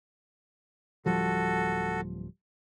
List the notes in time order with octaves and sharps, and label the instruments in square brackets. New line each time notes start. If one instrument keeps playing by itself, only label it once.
[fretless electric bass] D1 F3 G3 [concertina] F#4 A4